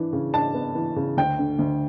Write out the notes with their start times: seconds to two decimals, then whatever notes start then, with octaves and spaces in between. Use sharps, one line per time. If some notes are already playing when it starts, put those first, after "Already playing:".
Already playing: E3 D4
0.13 C#3
0.34 D4 A5
0.54 B3
0.75 E3
0.96 C#3
1.17 D2 G5
1.39 D3
1.59 D2